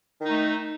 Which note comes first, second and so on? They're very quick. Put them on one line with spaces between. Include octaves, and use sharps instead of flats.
D#3 D#4 A3